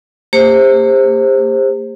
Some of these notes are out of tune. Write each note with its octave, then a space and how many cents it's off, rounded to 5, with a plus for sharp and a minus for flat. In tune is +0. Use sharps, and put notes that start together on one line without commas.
A#3 -35 G4 +40 C5 +15